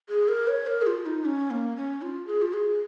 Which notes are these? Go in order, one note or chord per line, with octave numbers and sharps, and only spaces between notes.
G#4
A#4
C#5
A#4
G#4
F4
D#4
C#4
A#3
C#4
F4
G#4
F4
G#4